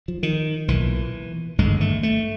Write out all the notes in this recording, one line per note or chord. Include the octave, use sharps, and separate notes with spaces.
F3
D#3
B1 A#2 E3
G#1 G2 D3 G#3
A3
A3